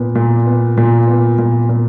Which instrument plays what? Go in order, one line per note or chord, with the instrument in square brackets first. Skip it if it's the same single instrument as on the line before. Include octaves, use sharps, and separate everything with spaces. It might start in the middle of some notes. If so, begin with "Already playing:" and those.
Already playing: [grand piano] A#2 B3
A#2
B3
A#2
B3
A#2
A#2